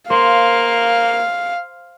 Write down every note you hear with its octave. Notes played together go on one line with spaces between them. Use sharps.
A#3 C5 F5